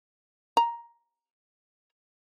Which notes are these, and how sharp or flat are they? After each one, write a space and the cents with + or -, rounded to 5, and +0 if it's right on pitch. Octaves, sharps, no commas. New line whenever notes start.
A#5 +10